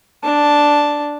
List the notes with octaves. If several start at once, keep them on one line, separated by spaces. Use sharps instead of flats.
D4 A5